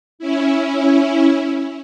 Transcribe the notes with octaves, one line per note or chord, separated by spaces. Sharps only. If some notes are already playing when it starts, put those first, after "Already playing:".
C#4 E4